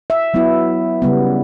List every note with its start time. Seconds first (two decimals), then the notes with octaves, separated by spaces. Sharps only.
0.10 E5
0.34 F#3 B3 E4
1.02 C#3 G3 B3